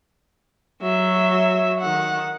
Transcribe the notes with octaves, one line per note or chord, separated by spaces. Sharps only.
F#3 E5
D#3 F#5